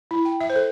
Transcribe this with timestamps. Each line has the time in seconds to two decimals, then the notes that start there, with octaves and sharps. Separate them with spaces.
0.11 E4
0.25 G5
0.41 E5
0.50 C5
0.56 A4